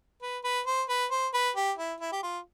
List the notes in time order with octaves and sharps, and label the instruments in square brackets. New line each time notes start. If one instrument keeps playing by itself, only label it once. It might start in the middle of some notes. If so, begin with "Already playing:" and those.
[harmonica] B4
B4
C5
B4
C5
B4
G4
E4
E4
G4
F4